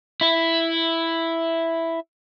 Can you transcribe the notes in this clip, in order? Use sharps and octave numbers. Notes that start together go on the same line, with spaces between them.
E4 E5